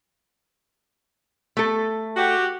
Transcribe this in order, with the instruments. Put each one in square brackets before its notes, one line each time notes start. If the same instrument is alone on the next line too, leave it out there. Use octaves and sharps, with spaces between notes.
[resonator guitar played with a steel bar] A3 A4
[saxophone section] F#4 G4